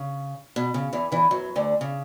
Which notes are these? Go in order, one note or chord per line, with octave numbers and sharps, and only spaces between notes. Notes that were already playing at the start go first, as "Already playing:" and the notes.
Already playing: C#3
B2
C#3
E2 E3
E2 E3
F#2 F#3
D2 D3
C#3